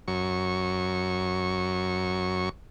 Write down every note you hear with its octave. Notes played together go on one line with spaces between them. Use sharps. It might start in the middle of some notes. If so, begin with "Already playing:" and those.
F#2 C#6